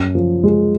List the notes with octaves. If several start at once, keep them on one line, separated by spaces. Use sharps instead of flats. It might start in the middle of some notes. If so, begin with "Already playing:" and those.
Already playing: F#2
F3
G#3